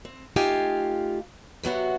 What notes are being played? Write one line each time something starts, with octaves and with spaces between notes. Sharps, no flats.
C4
A3 D#4 F4 G4 F5 G#5
C3 F#3 B3 F#4